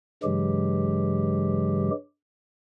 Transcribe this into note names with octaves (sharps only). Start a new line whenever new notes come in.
G2 C#3 E3 F#3 G#3 G4